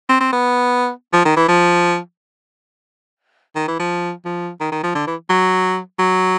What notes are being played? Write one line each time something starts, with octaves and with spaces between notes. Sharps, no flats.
C4
C4
B3
F3
D#3
E3
F3
D#3
E3
F3
F3
D#3
D#3
F3
D3
E3
F#3
F#3